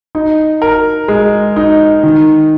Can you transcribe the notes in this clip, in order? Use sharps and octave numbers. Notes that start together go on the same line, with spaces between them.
D#4
A#4
G#3
D#4
D#3